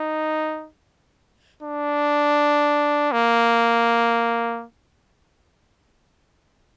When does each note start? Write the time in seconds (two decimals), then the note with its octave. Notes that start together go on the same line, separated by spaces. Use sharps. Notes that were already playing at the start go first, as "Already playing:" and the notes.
Already playing: D#4
1.63 D4
3.12 A#3